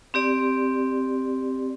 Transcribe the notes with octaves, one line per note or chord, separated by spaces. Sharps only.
C4 G4 D5